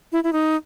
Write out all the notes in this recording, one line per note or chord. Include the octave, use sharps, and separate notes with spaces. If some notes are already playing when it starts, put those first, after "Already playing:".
E4
E4
D#4